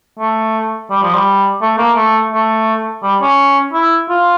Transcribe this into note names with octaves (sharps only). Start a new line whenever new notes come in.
A3
G3
F3
G3
A3
A#3
A3
A3
G3
C#4
E4
F4